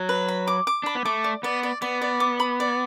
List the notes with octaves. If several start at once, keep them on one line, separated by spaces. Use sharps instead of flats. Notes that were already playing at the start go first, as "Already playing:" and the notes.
Already playing: F#3
B4
B5
D6
D6
D4 B5
B3
A3 D6
D5
B3 D5
D5
B3 D5
D5
D6
B5
D5